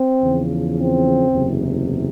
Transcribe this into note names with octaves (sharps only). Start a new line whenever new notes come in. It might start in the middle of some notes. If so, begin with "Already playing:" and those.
Already playing: C4
E2 C#3 F3
C4
F#1 E2 C3